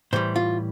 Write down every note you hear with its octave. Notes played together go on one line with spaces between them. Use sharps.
A2 E3 G3 C5
F4